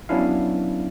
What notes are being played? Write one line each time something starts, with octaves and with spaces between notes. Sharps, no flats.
F#3 B3 C#4 D4 E4 F5